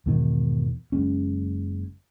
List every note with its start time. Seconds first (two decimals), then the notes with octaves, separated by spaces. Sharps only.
0.06 E2 G#2 B2 D#3
0.92 F#1 G#3 C#4